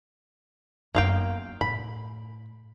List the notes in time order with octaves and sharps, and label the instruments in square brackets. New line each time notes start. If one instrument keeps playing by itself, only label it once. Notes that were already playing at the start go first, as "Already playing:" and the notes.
[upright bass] F#2 B3 [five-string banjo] A#3 F5 G5
[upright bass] A2 [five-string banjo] B5